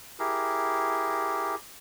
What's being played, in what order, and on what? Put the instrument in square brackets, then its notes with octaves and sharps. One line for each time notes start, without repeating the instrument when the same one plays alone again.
[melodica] E4 G4 G#4 A#4